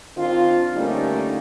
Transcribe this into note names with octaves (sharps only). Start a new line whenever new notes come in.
D#3 C4 D4 F4
D3 G3 A3 A#3 C#4 D#4